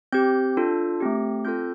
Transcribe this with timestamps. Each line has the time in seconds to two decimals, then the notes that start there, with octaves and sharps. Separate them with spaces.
0.12 C4 G4 G6
0.57 D4 F4 A4
1.00 A3 C4 G4
1.45 C4 F4 A4 G6